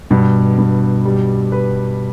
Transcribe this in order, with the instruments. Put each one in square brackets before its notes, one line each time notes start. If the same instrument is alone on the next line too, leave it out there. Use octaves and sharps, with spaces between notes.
[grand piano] G2 [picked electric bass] B2
[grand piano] G2
G3
B4